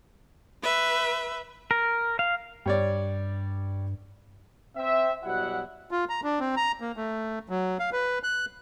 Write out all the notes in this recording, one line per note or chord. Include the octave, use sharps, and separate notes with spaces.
B4 E5
A#4
F5
G2 G3 C#5 D5
C4 E5
B2 F#3 G3 E4 F#5
F4
A#5
D4
C4
A#5
A#3
A3
F#3
F5
B4
F#6